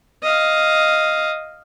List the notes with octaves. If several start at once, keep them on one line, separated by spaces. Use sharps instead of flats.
D#5 F5